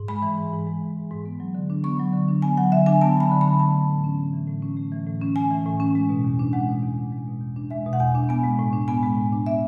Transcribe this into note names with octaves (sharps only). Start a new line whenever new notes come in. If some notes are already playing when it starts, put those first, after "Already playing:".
Already playing: G#2
G#3 B5
E3
G#2
G#2
G#3
E3
G#2
G#2
B3
F#3
D3
D4
B3 C#6
F#3
D3
D4
B3 G#5
F#3 F#5
D3 E5
D4 G#5
B3 A5
F#3 B5
D3
D4 B5
A3 A5
E3
A2
C#4
A3
E3
A2
C#4
A3
E3
A2
C#4
A3 G#5
E3
A2
C#4
G#3
B2
E2
D4
G#3 F#5
B2
E2
D4
G#3
B2
E2
D4
G#3 E5
B2
F#5
E2 G#5
D4
B3 G#5
G#3
A2
D4
B3 G#5
G#3
A2
D4
B3 E5